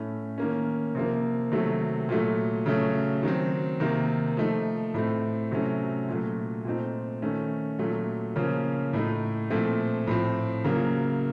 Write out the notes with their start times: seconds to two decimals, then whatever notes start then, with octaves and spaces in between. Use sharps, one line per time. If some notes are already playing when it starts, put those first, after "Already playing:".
Already playing: A2 A3 C#4
0.38 D#3 A#3 C#4
0.95 C3 F3 A#3
1.52 C3 D#3 F#3 A3
2.09 A#2 F#3 A3
2.66 C#3 F#3 A3 C#4
3.23 D#3 F#3 C4
3.80 C3 D#3 A#3
4.37 F3 A3 D#4
4.94 A2 A3 C4
5.51 C3 F#3 A3 C#4
6.08 A#2 F#3 A3
6.65 A#2 A3 C4 D#4
7.22 D#3 A3 C#4
7.79 A#2 F#3 A3
8.36 C#3 F3 A#3 C#4
8.93 A2 A3 D#4
9.50 A#2 F3 A3 C4
10.07 A2 F3 C4
10.64 C#3 F#3 A#3